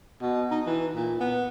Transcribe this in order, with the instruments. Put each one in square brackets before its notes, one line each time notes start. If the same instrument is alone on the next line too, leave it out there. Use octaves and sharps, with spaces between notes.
[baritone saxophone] B2
D#4
E3
A#2
B3